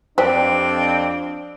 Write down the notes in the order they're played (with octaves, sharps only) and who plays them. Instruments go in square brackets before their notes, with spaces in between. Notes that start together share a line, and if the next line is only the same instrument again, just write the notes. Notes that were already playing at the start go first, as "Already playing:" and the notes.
[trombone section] F2 D4 [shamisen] G3 [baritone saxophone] C4 [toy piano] C5